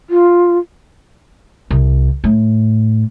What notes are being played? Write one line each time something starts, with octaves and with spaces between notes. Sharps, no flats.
F4
C2
A2